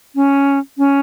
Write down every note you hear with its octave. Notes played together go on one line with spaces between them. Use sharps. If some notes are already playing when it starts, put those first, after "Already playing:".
C#4
C#4